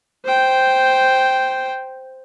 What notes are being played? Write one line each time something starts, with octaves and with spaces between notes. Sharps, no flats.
C5 G5